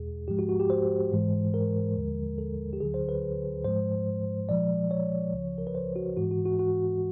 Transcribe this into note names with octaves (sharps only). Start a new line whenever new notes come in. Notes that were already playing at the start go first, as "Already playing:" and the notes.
Already playing: E2 B2 G#3 G#4
G#2 F3 G#3 G4
F#4
F#4
G4
C5
G#2 E3 G#3
A#4
D#2 D3 F3 G#3
A4
G4
D2 D3 F#3 G#4
C5
B4
G#2 F3 G#3 C5
A#2 F3 G#3 D5
C#5
C#2 C#3 F3
A#4
B4
C5
F#4
G#2 E3 G#3 F#4
F#4
F#4
F#4